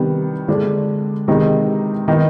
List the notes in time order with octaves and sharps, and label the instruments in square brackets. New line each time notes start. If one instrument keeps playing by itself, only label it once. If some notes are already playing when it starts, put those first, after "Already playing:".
Already playing: [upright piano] C3 D#3 G3 B3
D3 G#3 D4
C3 D#3 G#3 B3 D#4
D#3 B3 D#4